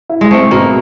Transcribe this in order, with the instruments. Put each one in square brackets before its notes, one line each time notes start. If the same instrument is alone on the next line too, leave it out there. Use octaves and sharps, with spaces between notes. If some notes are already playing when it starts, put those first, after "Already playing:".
[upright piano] E4
[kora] G#3
[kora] A3 [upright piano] C4
[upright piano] B2 [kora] A#3